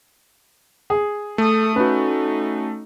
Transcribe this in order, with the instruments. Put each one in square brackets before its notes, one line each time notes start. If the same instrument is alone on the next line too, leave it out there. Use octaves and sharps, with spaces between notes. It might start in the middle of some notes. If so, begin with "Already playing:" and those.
[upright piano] G#4
[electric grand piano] A3 [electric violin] A4 D#6
[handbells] C#4 F#4 [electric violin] D#4 [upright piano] B4